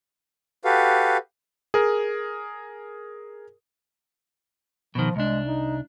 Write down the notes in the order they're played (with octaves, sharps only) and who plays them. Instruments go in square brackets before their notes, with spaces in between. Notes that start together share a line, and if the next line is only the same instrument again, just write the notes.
[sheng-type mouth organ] F#4 G4 A4 B4 F5
[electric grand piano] G#4 A#4
[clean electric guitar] B2 D#3 [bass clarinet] F3
[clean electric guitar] C2 D4 [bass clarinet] G#3
[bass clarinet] D#4